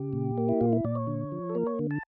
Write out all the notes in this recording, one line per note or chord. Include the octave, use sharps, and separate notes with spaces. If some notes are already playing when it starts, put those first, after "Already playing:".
Already playing: C#3 G4
A#2
A#3
E4
A#2 F4
E4
A#2 D5
C#5
D3
F3
A4
A#3 A#4
C#5
D3
A5